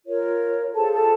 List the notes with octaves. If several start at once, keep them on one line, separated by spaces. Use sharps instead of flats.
F4 A#4 C#5
F4 G#4 A4 C5 A5
A4 A5